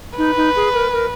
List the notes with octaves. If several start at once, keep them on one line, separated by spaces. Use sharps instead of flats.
D#4 B4
D#4
G#4
A#4
A#4